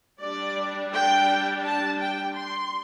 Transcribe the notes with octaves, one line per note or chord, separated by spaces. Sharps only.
G3 D4 D5
G5
A5
G5
C6